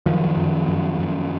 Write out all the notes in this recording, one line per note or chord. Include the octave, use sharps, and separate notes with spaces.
F#2 D#3 F3
F#2
F#2
F#2